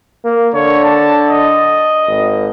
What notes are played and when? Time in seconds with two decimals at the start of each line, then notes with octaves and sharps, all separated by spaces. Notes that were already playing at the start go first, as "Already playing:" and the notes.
0.24 A#3
0.54 D3 C#5
0.84 A5
1.29 D#5
2.08 G#1